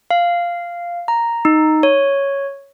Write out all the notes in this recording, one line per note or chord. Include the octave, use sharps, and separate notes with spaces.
F5
A#5
D#4
C#5